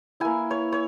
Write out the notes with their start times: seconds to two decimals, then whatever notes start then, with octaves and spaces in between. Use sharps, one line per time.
0.20 A#3 E4 G#5
0.50 C#5
0.72 C#5